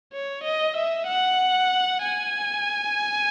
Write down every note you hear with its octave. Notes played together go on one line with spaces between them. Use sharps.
C#5
D#5
E5
F#5
G#5